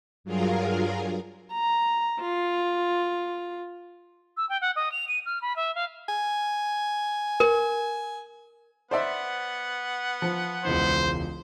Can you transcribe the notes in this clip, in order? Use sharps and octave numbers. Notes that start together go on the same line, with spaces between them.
G2 F#3 F4 G#4 A#4 F5
A#5
F4
E6
G5
F#5
D#5
F7
D#7
F6
B5
E5
F5
G#5
A#4
B3 C5 D5 E5 F#5
F3
E1 C#2 E3 C5